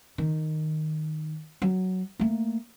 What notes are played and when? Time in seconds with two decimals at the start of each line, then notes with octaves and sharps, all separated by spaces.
0.18 D#3
1.62 F#3
2.20 A3 A#3